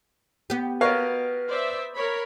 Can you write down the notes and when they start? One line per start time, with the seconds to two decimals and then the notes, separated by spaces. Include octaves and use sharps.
0.50 B3 G4
0.81 A#4 B4 C#5 D#5 F5
1.47 C5 D5 E5
1.94 A#4 C#5 B5